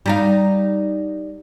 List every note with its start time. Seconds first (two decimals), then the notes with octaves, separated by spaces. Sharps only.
0.06 G3 D#4 F5